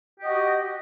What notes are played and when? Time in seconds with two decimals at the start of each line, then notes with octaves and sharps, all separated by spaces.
0.20 G4
0.23 D#5
0.26 F#4